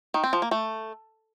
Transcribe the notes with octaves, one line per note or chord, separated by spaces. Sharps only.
D#3
C4
F3
A#3
A3